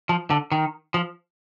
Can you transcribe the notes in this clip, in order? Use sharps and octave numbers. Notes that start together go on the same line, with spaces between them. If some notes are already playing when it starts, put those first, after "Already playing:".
F3
D3
D#3
F3